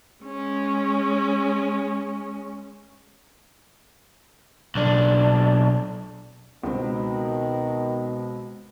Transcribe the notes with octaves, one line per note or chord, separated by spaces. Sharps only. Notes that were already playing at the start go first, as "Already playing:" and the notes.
G#3 C#4
B1 D4
C#2 B2 D#3 C4